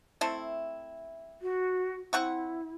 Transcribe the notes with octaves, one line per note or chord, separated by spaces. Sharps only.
A3 C4 E4
F#4
C4 E4 F#5 C#6